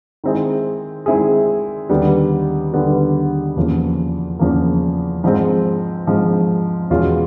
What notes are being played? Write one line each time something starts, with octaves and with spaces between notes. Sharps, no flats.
D#3 G#3 C4 E4 G#4
D#3 G#3 C4 E4 G#4
D#2 D3 G3 B3
D#2 D3 G3 B3
E2 C#3 F3 A#3
E2 C#3 F3 A#3
G#2 F3 G#3 C4
G#2 F3 G#3 C4
E2 B2 G#3 C#4 F4